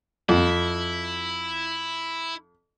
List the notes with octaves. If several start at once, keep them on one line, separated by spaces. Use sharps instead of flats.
F2 E4